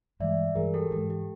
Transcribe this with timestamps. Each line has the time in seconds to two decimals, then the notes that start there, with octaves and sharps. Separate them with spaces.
0.20 G2 E3 G#3 D5 E5
0.55 G2 E3 G#3 G#4 A#4
0.74 G4 A4
0.91 G#2 E3 G#3 G4 A4
1.10 G4